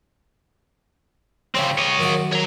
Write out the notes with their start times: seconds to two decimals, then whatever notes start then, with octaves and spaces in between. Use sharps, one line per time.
1.55 C#3 G3 C4 C#4
1.78 C#5 D#5
1.98 F#2 D#3 F#5
2.32 C#5 A#5